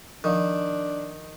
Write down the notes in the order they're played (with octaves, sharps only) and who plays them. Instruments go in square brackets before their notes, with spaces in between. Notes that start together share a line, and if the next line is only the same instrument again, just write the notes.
[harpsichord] D#3 [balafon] F3 F5 [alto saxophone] D4